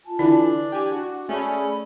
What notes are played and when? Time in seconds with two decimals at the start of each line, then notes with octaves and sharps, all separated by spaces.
0.04 F4 G#5 A5
0.19 D3 E3 D4 E4
0.72 G4 G#5 D6
0.92 F#4
1.29 A3 C#4 G#4 D5 G#5 B5